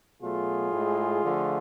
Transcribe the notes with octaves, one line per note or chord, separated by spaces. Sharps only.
B2 F#3 A3 F4 G#4
A2 G#3
D3 F3 A3